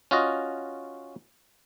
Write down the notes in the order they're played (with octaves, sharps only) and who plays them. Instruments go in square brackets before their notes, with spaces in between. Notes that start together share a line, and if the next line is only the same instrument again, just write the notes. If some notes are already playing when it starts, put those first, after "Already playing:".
[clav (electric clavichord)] C#4 F4 F#4 D#5